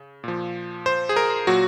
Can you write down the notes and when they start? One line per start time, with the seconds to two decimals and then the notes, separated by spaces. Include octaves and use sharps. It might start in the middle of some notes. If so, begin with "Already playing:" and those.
Already playing: C#3
0.24 A#2 F3
0.86 C5
1.09 G#4
1.16 A#4
1.47 A#2 F#3 F#4